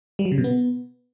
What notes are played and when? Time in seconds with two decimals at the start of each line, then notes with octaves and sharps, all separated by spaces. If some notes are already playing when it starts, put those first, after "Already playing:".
0.19 G3
0.25 F#3
0.32 C#3
0.38 B2
0.44 B3